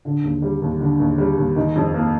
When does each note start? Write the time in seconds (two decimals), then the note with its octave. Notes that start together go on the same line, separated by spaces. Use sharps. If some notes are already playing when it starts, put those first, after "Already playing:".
0.05 D3
0.24 D#2
0.42 G3
0.62 D#2
0.80 D3
1.00 D#2
1.18 G3
1.37 D#2
1.56 D#3
1.76 F2
1.94 A#3